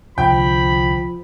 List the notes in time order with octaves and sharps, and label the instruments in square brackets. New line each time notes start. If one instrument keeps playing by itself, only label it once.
[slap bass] C2 D3 [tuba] F3 [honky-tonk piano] G5 [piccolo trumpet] B5